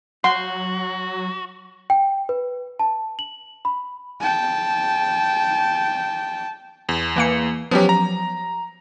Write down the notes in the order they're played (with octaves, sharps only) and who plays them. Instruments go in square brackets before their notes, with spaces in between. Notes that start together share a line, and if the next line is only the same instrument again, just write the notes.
[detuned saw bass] F#3 [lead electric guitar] F#4 [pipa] F#5 [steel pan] C6
[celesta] G5
B4
A5
F#7
B5
[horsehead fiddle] G5 A5
[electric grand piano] E2
[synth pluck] E3 A#3 C#7
[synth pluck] F3 F#3 [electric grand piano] B3 C#4 G4
[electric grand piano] A#5